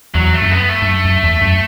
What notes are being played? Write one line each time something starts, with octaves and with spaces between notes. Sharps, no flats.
E2 F#3
A3
F#2
B3
A3
G2
F#2
F#2
E2
F#2